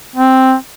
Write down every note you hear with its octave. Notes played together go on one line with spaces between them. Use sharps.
C4